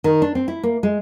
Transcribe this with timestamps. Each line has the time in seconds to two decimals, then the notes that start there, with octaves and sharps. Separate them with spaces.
0.04 D#3
0.22 D4
0.35 C4
0.48 E4
0.63 A#3
0.83 G#3